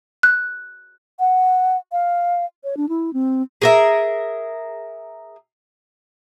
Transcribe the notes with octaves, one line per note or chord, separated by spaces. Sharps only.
F#6
F#5
F5
C#5
D4
E4
C4
G#4 A#4 E5